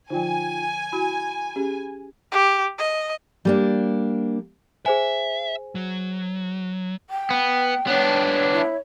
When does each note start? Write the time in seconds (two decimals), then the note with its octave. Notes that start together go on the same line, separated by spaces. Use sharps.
0.10 D3 F3 D#4 F4 G5 G#5
0.92 E4 F#4 B5
1.56 C#4 G4 G#4
2.32 G4
2.79 D#5
3.45 G3 A#3 D4
4.86 G#4 C5 E5 G#5
5.75 F#3
7.09 G5
7.30 B3
7.87 B3 D4 C#5
8.53 E4